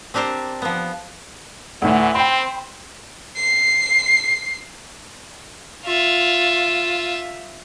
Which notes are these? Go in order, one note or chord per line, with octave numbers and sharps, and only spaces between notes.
C4 D4 G4 A#4 C5
F3 B3
D2 A2 E3
C4 G5 B5 C6
C7
F4 E5